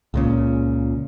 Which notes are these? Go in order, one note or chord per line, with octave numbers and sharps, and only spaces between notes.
C#2 A#2 C#3